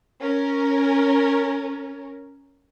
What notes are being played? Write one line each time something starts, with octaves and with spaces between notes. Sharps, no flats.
C#4 A#4